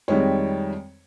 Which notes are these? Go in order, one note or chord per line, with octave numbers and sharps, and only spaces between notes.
F2 D#3 G3 G#3 C#5